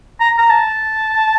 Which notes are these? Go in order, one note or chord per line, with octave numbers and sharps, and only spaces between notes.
A#5
A#5
A5